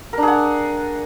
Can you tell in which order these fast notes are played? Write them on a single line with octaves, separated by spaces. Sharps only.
A#4 D4 G#4 F#5